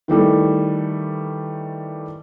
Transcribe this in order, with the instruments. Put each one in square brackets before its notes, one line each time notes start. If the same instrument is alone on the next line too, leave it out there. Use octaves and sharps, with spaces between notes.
[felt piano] D#3 E3 G3 A3